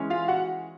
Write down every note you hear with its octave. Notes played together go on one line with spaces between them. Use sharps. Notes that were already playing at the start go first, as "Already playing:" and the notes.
Already playing: E3 G#3 C#4
F4 F5
F#4 F#5